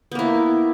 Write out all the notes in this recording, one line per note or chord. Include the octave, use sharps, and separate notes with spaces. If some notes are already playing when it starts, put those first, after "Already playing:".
A#3 B3 E4